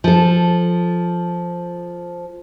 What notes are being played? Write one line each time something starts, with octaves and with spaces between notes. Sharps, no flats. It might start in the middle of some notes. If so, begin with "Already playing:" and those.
F3 A4